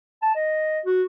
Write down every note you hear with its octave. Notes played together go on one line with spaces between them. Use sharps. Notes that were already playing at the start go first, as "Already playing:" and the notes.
A5
D#5
F#4